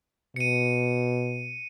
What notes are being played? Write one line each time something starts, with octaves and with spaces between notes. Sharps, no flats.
B2 C#7 D#7